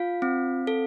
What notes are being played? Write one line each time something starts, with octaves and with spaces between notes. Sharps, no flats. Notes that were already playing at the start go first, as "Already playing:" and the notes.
Already playing: F4 F5
C4
A4